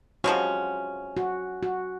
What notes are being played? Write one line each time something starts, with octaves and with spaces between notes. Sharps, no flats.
C3 F3 G#3 C#4 F#4
F#4
F#4